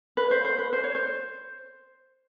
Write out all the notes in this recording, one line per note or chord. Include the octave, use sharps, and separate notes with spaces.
B4
C5
C5
B4
C5
C#5
C5